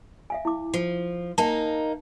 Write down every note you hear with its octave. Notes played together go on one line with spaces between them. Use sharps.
E5 F5 G#5
E4 D6
F3
A#3 D#4 G#5 A5